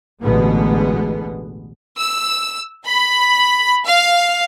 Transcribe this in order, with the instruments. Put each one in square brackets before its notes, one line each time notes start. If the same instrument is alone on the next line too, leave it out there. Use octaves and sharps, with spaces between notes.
[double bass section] A1 D2 B2 D3 G#3 B3
[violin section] E6
B5
F5